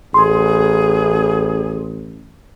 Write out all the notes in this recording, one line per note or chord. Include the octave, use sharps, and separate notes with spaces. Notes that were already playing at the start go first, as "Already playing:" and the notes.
A1 G#4 C6